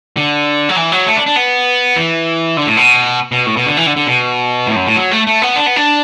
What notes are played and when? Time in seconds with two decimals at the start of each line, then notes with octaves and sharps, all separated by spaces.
0.17 D3
0.69 F#3
0.76 E3
0.92 F#3
1.06 A3
1.16 D4
1.26 D4
1.36 B3
1.96 E3
2.57 D3
2.66 A2
2.77 B2
3.32 B2
3.46 A2
3.57 B2
3.67 D3
3.77 E3
3.86 D3
3.96 D3
4.07 B2
4.67 A2
4.76 F#2
4.87 A2
4.96 F#3
5.11 A3
5.27 A3
5.42 B3
5.56 D4
5.66 B3
5.76 D4